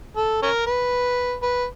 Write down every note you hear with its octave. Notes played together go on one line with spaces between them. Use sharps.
A4
C#4 A#4
B4
B4